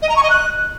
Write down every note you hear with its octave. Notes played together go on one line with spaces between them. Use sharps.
D#5
A#5
C#6
D#5
F#6